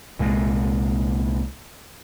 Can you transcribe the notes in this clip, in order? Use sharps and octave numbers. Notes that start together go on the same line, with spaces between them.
C2 A#2 G#3